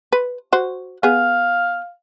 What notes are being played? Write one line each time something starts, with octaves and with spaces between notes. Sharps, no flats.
B4
F#4 C5
B3 G#4 F5